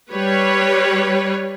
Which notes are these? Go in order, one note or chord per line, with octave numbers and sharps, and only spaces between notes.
G3 B4 C#5